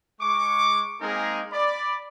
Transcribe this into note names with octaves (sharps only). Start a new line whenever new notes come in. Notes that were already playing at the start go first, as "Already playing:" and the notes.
G#3 C#6 D6
G#3 A#3 C4 D#4 G#4 A#4
D5 B5